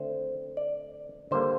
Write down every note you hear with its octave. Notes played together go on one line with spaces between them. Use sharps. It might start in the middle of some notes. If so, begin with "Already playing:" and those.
Already playing: D3 A3 C4 C5
D5
D3 G3 A#3 C5